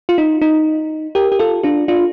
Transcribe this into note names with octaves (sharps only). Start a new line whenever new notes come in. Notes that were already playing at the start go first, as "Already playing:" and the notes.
F4
D#4
D#4
G4 A#4
G4
F4 A4
D4 F4
D4 F4